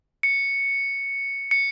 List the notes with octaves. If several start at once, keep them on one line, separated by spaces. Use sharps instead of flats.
C#7
C#7